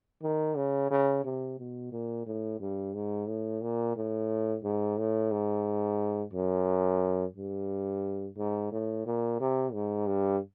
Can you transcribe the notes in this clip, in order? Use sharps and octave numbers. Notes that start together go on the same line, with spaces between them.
D#3
C#3
C#3
C3
B2
A#2
A2
G2
G#2
A2
A#2
A2
G#2
A2
G#2
F#2
G2
G#2
A2
A#2
C3
G#2
G2